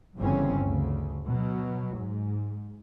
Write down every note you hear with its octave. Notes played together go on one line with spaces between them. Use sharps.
G1 G2 C#3 E3 C4 C#4
D2 C#3
B2 F#3
G#2